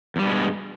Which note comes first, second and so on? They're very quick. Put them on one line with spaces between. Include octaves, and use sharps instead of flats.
E2 G3 G2 B2 G#3